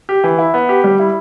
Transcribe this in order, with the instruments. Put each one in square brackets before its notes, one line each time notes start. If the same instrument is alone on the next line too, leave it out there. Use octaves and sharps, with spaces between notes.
[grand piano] G4
E3
E4
B3
G4
G3
E4